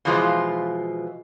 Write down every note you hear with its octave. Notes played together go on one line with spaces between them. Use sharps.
B2 E3 F3 G#3 F4